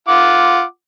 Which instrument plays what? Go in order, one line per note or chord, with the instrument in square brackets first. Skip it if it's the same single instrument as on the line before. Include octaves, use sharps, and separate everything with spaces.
[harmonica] F4 F#5 D6